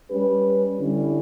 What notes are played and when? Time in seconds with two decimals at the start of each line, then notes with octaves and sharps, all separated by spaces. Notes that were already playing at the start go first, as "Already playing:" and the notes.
0.10 G3 C#4 G4 B4
0.79 D3 G3 C#4 E4